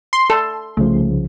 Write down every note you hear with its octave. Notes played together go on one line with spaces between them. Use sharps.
C6
A4
C2 C#3 F3 A3